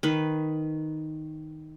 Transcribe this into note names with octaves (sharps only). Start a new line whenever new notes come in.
D#3 B4